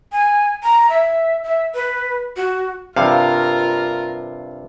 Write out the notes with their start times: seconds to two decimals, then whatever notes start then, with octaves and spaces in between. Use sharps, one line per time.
0.12 G#5
0.63 A#5
0.90 E5
1.44 E5
1.74 B4
2.37 F#4
2.96 G2 C3 F4 A#4 F5